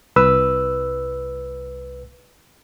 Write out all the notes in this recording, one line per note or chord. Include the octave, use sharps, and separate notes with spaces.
C2 B4 E6